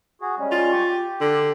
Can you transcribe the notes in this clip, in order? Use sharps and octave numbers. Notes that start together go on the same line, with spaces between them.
F#4 G#4
G3 G#3 C#4
F4
G4 C#6
G4
D3